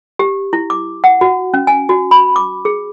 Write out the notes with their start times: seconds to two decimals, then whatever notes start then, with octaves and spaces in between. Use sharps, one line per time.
0.19 G4
0.53 E4
0.70 D6
1.04 F#5
1.21 F#4
1.54 C#4
1.67 G#5
1.89 F#4
2.11 B5
2.36 D6
2.65 G#4